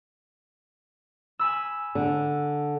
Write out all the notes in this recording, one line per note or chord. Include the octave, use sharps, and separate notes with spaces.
G#5 B5 E6
D3